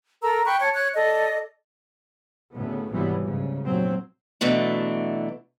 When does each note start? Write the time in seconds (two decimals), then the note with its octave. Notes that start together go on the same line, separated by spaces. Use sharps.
0.23 A4 A#4 A#5 E6
0.46 G5 B5 C#6 F#6
0.61 C#5 A5
0.75 C#5 F#6
0.94 A4 D5 D#5
2.55 D2 A2 C#3 B3
2.90 G#1 C3 E3 F#3 G3 B3
3.24 D2 G#2 C#3
3.65 F1 A#2 F#3 C4
4.41 B2 E3 F#3 A3 D4